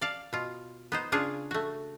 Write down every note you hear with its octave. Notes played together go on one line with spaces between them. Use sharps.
D5 F5 A5
B2 F4
B3 D#4 C5
C#3 D4 F4 G#4
A3 F#4